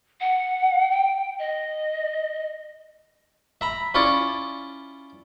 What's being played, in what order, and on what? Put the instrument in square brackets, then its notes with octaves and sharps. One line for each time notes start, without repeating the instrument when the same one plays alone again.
[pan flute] F#5
G5
D#5
[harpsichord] E5 A#5 B5
C#4 E4 F4 C#5 D5